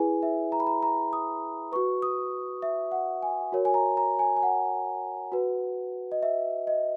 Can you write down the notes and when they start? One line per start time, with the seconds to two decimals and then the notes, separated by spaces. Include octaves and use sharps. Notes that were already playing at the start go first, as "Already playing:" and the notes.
Already playing: E4 G#4 B4 G#5
0.22 E5
0.52 A#5
0.60 B5
0.67 A#5
0.83 A#5
1.13 D#6
1.72 F#4 B4 C#6
2.02 D#6
2.62 E5
2.92 F#5
3.22 G#5
3.52 F#4 A#4 C#5
3.65 G#5
3.74 A#5
3.97 A#5
4.19 G#5
4.37 G#5
4.43 F#5
5.32 F#4 B4
6.12 D#5
6.23 E5
6.67 D#5